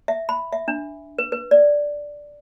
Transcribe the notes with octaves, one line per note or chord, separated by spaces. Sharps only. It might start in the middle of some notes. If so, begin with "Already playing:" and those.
E5
B5
E5
D4
B4
B4
D5